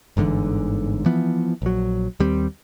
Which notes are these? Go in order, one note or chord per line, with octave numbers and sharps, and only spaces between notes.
G1 G#2 D3 E3
E3 F3 B3
A#1 F#3
D#2 G3 C4